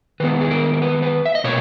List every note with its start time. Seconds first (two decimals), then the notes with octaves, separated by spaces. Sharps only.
0.20 D#3 G#3 B3 B4
0.41 G#4
0.51 A#4
0.74 A#4
0.82 B4
1.03 B4
1.26 E5
1.35 D#5
1.44 B2 A#3 C#5